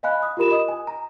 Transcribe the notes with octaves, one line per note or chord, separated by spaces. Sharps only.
D#5 F5 G#5 B5 F#6
D#6
F4 G4 A#4 B5 E7
D#5 D#6
G#5
A#5